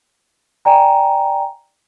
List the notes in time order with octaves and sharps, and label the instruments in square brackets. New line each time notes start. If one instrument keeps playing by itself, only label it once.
[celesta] D5 G5 G#5 A#5